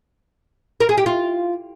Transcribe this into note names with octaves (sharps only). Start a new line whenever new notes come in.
A#4
G#4
G4
F4